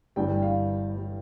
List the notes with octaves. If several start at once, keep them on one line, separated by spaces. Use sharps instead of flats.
G1 G2 E3 G3 G5
F5
E3 G3